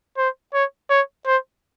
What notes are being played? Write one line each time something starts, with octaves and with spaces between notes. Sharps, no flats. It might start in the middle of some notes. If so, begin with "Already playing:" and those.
C5
C#5
C#5
C5